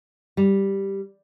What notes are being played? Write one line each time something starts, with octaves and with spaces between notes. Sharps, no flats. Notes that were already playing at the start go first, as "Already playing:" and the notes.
G3